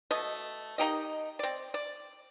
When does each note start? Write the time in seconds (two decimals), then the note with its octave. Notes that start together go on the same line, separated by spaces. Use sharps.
0.11 B2 A3 D#5
0.78 A#3 D#4 G4 D#5
1.39 C4 D5
1.74 D5